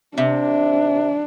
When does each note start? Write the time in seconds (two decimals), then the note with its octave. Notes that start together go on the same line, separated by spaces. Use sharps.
0.17 C3 D4